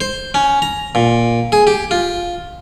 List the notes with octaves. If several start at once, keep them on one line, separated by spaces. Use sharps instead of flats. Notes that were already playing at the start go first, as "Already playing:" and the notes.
C5
C#4
A#5
A#2
G#4
G4
F4